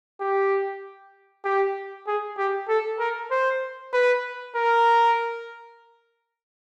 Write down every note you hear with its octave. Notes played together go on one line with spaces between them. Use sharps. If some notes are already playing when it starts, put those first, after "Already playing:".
G4
G4
G#4
G4
A4
A#4
C5
B4
A#4